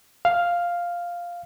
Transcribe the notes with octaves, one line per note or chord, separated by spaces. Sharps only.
F5